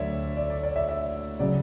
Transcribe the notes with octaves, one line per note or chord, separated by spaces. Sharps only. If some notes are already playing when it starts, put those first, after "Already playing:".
Already playing: D2 D3 F#3 C#5 D5 E5
D5
D5
D5
E5
E5
C#3 F#3 D5